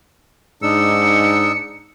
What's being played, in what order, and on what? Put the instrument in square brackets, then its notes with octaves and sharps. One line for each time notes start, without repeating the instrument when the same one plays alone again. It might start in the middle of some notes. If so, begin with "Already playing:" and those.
[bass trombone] G#2 [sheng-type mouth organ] D4 D#4 E6 [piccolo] C#7